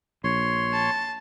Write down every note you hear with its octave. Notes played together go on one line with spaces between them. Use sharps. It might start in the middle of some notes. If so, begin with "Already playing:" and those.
A#1 C#5 C6
A5